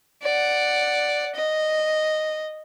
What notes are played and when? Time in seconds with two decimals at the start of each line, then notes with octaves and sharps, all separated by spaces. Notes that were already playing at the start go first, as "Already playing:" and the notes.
0.23 D5 F#5
1.35 D#5